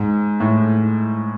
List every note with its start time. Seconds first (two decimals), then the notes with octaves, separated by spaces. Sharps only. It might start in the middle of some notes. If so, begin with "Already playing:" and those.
Already playing: G#2
0.40 A2